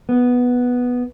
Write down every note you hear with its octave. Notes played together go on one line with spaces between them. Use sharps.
B3